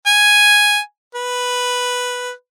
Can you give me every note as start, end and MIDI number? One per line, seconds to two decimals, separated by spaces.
0.06 0.79 80
1.15 2.31 71